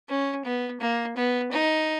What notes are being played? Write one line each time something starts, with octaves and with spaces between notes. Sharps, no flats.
C#4
B3
A#3
B3
D#4